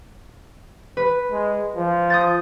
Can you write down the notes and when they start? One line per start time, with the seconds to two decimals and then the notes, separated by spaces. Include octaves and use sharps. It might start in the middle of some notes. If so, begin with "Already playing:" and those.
0.97 B4
1.32 G#3
1.76 F3
2.10 D#6 G6 A6